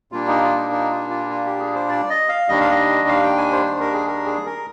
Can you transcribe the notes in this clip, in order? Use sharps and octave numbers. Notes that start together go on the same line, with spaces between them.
A#2 G3 A#3 D4 F4
D#4
F4
D#4
D#4
F4
F4
F4
G4
G#4
C5
D5
D#5
F5
D#2 D#3 G3 D4 D#5
F5
D#5
F5
G5
G#5
C5
C5
A#4
G#4
A#4
G#4
A#4